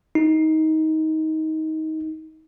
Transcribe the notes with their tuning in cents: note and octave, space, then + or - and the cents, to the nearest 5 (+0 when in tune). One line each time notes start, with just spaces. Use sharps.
D#4 +20